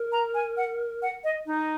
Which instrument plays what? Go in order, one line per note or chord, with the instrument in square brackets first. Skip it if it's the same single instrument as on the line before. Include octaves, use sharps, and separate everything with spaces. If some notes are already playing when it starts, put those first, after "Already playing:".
Already playing: [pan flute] A#4
[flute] A#5
G#5
F#5
F#5
D#5
D#4